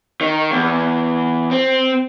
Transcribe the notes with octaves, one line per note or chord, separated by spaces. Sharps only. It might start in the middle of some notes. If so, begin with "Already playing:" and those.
D#3
E2
C4